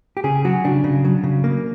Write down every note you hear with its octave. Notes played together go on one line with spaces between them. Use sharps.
G4
C#3 G#4
F#3 F#4
C#3 D4
C#3
F#3
C#3
A#3